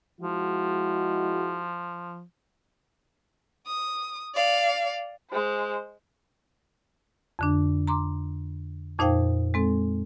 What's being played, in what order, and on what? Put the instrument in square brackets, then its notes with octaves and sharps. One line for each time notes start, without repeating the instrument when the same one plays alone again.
[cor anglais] F3 [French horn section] G#3 E4 F#4
[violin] D#6
D5 F5
[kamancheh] G#3 C5
[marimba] F2 D3 D4
A#5 C6 D6
F2 A#2 D#4 C5 F5 G5
G#3 C4 A4